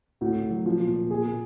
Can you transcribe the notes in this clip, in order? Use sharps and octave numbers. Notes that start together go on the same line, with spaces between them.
A2 F#4
A2
F#3
F3
A#2
A#2
A#2 G#4
A#2